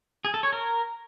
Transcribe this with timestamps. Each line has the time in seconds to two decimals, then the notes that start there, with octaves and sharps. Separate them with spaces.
0.25 G#4
0.34 A4
0.43 C#5
0.53 A#4